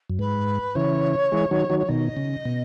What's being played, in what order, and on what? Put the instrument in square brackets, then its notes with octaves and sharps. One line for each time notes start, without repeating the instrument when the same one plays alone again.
[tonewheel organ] F#2
[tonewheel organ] G#2 [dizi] B4
[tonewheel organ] C#3 E3 [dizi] C#5
[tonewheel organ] E3 G#3
D#3 F#3
D#3 F#3
[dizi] C#5
[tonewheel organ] B2 D#3 [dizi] D#5
[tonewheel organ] C#3
B2